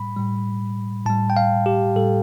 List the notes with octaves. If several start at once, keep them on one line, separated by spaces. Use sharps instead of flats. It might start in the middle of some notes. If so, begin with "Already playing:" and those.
Already playing: A2 G3 B5
A2 G3
A2 G3 A5
G5
F5
G4
A2 G3 A4